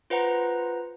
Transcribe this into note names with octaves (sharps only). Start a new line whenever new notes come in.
F4 B4 C5 F#5 A#5